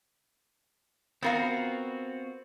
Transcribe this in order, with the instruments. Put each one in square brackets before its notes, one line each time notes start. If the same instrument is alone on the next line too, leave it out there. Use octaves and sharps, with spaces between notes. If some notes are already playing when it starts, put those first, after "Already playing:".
[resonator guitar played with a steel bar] B3 A#4 F5 [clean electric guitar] C4 F4 F#4